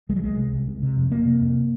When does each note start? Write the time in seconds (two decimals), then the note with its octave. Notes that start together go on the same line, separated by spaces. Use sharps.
0.09 C2 G#3
0.16 F#3
0.24 C2 G#3
0.38 C3
0.52 C2
0.68 C3
0.83 C3
0.97 F2
1.11 C3 A#3
1.26 C3
1.41 F2